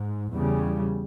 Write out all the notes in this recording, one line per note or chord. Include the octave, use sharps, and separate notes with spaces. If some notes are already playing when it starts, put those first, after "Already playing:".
Already playing: G#2
E2 C#3 G3